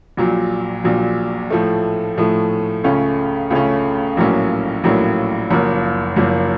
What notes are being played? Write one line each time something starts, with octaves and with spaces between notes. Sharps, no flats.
A#1 A#2 F#3
A#1 A#2 F#3
A2 F3 A3
A2 F3 A3
C#2 C#3 A3 C#4
C#2 C#3 A3 C#4
A#1 A2 F#3 A#3 C#4
A#1 A2 F#3 A#3 C#4
F#1 F#2 F3 A#3
F#1 F#2 F3 A#3